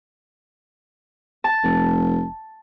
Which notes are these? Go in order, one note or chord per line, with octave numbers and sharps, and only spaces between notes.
A5
F1